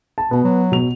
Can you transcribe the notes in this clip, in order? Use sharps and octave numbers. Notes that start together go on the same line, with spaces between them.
A5
B2 B3
F#3
B2 F7